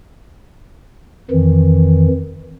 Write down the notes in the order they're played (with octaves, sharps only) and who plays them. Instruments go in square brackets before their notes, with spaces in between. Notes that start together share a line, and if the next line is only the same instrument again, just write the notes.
[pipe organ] F2 D#3 E3